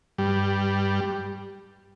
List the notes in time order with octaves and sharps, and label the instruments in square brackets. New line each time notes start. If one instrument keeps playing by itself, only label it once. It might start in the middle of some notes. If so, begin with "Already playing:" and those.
[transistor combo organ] G2 G3